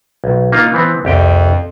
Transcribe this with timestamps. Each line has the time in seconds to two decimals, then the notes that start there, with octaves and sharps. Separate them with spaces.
0.24 B1
0.52 A#3 D#4 F4
0.74 E3 B3 C4
1.05 C2 F2 G4 G5